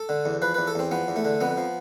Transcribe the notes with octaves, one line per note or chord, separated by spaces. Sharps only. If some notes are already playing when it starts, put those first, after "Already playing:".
Already playing: A4
D3
E2
F3 B4
E2 B4
A4
E2 C4
F3 B3
E2
A3
D3
F2 B3
F3